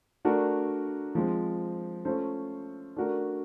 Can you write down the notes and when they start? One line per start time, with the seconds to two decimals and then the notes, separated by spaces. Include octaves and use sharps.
0.25 A3 D4 F#4 A#4
1.15 F3 G#3 C4
2.05 A3 C#4 F4 A4 C5
2.96 A3 D4 F#4 A#4